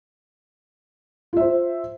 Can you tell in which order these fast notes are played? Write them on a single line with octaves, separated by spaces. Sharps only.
F4 E5 C5